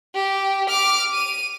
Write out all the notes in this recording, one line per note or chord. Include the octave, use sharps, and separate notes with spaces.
G4
D6 F6
D#7